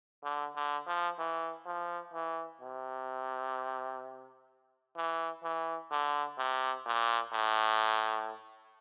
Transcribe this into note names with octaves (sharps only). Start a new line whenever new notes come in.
D3
D3
F3
E3
F3
E3
C3
E3
E3
D3
C3
A#2
A2